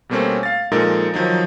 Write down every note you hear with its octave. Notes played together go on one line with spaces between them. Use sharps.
B2 G3 A3 A#3 C4 C#4
F5 A6
A#2 F3 G#3 D#4 A4 A#4
D#3 F3 F#3 D#4